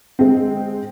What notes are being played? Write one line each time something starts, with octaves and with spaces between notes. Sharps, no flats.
G#3 C4